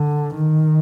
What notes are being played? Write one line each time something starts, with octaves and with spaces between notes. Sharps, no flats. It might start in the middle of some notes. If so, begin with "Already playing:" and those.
Already playing: D3
D#3